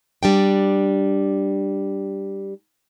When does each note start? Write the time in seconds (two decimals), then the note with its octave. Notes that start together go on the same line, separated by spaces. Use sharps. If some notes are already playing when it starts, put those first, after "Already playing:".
0.23 G3 D4 G5